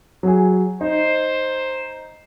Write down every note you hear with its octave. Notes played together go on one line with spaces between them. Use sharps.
F#3 G#4
D#4 C5